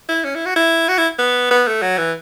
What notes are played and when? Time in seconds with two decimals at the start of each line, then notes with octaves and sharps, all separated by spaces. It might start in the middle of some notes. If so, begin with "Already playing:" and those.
0.09 E4
0.25 C#4
0.35 E4
0.46 F#4
0.56 E4
0.88 F#4
0.98 E4
1.19 B3
1.51 B3
1.67 A3
1.82 F#3
1.98 E3